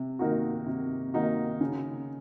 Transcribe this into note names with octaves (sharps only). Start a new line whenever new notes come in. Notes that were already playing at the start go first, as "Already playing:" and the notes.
Already playing: C3
D#3 A#3 D#4 F#4
C3
D#3 A#3 D#4 F#4
C#3